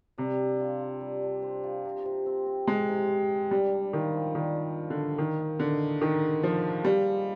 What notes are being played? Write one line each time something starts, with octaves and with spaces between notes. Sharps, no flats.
C3 G3
D4
F4
F4
G3
D4
C5
F4
C3
C3
C4
C4
C3 G#3
C3
C3
C3
G3 D4
D4
D#3 F3
F3
D#3 D4
D4
F3
D3
F3
D#3 D#4
A#3
D3 D#4
G#4
D#3 G#4
G#4
F3 A#3
A#3
F3 G3
G#3